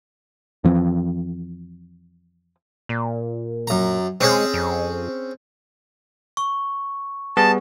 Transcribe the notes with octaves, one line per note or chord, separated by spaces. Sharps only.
F2 E3 F3 C4
A#2
F#2 A#5
G#3 C4 C#4 G#4
F2
C#6
G3 B3 G#4 A5